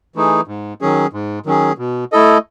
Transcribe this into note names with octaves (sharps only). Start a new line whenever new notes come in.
E3 A3 D#4 G#4
G#2
D#3 F#3 C#4 G#4
G#2
D#3 F#3 C#4 G#4
B2
A3 E4 A4 D#5